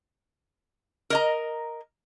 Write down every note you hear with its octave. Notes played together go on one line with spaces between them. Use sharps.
A#4 D#5 A#5